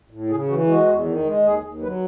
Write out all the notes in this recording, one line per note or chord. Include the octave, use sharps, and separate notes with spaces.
A2
C#3 G#4
E3 F#4
G#3 F#4
E2
D#3
G#3
D#2 G#4
D#2
F#3 B4